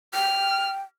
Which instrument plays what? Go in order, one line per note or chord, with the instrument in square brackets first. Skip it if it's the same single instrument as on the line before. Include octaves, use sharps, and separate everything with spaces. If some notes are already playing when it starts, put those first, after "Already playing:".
[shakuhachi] G5 [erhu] F6